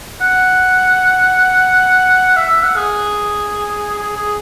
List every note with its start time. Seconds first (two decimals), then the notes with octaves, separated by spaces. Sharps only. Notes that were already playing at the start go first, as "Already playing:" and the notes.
0.21 F#5
2.36 E5
2.50 E5
2.63 F#5
2.76 G#4
3.98 G#4
4.16 G#4